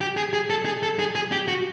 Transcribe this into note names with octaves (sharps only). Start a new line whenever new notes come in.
G4
G#4
G#4
A4
G#4
A4
G#4
G#4
G4
F#4